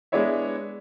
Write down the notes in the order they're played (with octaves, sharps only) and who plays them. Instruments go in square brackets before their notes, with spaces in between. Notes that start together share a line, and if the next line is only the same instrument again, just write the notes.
[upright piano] G#3 B3 D4 E4 C#5 E5